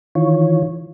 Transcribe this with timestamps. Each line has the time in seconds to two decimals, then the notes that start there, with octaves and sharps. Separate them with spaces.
0.15 D#3 E3 F4 C#5